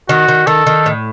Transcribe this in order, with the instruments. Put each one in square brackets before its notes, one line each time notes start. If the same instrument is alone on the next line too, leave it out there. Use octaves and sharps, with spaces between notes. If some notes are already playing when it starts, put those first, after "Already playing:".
[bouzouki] D#3 [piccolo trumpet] F#4
[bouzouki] D#3
[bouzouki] D#3 [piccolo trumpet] A4
[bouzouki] D#3
A2